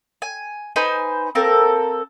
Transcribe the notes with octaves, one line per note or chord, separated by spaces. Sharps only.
G#5
D#4 B4 C5 G#5
A#3 C4 A4 A#4